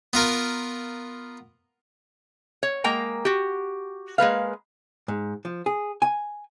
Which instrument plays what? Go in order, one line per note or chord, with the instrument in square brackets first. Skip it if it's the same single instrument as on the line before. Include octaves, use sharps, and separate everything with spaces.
[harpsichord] B3 F4 A#4
[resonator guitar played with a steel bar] C#5
G#3 A#3 G5 A#5
F#4 G4
G#3 A#3 B4 F5
[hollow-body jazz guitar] G#2
F3
G#4
G#5